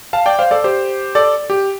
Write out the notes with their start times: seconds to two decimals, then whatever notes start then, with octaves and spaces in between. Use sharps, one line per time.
0.13 F5 A5
0.26 D5 G5
0.39 C5 F5
0.51 A4 D5
0.64 G4 C5
1.15 A4 D5
1.50 G4